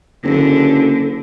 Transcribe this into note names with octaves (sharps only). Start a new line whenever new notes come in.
F#1 D3